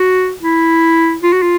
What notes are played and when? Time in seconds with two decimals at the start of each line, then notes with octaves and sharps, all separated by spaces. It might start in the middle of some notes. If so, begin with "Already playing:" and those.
Already playing: F#4
0.42 E4
1.23 F4
1.32 F#4
1.42 F4